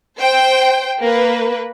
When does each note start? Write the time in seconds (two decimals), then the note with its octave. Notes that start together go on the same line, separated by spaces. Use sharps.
0.19 C5 G5
1.01 A#3 B4